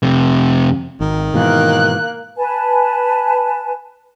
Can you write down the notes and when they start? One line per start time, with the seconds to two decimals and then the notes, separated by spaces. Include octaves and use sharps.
0.03 F2 C3
1.01 G#1 D#3
1.34 G#2 B2 E3 A#3 F#6
2.37 B4 G#5 A5